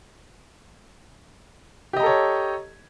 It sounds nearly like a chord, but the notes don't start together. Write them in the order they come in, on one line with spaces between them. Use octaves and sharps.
G4 D#5 A#5 A4 C#5